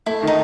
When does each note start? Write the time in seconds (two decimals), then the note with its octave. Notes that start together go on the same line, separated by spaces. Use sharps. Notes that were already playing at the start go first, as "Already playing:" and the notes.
0.06 A3 E4
0.23 D#3 D#4